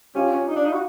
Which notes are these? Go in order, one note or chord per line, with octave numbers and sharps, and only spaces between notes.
C#4 F4 G4
C#4
D#4
D4
D#4
F#4